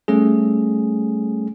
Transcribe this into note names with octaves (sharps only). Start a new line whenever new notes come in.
G3 A3 C#4 G#4